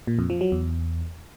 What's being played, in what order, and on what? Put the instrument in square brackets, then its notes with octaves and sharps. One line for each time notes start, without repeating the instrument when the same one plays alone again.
[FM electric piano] A#2
F2
F3
F#3
E2